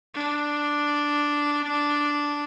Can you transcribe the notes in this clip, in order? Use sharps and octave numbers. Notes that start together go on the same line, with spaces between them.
D4